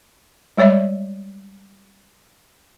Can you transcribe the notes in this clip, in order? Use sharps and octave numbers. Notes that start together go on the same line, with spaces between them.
G3 G#3 C#5 D5 E5